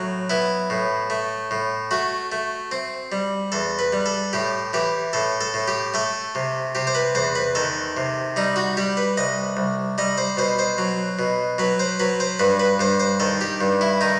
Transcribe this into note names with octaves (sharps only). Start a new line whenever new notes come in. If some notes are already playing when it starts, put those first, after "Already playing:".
Already playing: A2 F#3
B3 E4
A2
A3
A2
A3 F#4
A3
C4
G3
E2 A4
B4
G3
A4
A2 G4
E3 G4
A2 A4
A4
A2
G4
A3 A4
C3
C3 G4
C5
B4
E2 C5
B4
D#3 A4
C3
G3 D#4
F#4
G3 G4
B4
C2 D#5
C2
G3 D#5
C5
B2 C5
C5
F#3
B2
F#3 B4
C5
F#3 B4
C5
G2 B4
B4
G2 C5
C5
D#3 A4
G4
G2
E4
D#3 D#4